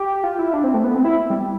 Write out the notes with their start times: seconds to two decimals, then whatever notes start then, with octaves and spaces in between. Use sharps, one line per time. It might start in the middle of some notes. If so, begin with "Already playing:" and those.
Already playing: G4
0.24 F4
0.39 E4
0.54 D4
0.64 C4
0.74 A3
0.84 B3
0.94 C4
1.04 E4
1.30 G3